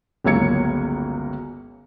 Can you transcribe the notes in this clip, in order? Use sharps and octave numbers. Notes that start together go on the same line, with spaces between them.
G1 C#2 F#3 A#3 G#6 C#7